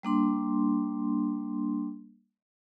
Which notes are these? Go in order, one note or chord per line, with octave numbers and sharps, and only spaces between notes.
G3 A#3 D4 C6